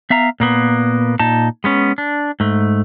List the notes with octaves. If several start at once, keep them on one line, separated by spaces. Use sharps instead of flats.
B3 E5 F5 A#5
A#2 A#3 B3
A#2 D#4 A5
G#3 B3 C#4
D4
G#2 A3